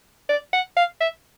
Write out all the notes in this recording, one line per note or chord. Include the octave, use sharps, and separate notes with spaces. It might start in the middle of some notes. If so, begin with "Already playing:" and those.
D5
F#5
F5
E5